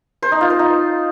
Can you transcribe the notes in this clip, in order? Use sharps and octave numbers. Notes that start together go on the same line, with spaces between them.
C5
D#4
F4
C5
D#4